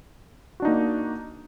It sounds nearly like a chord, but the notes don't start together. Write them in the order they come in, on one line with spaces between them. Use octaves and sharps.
F#4 D4 D#4 A#3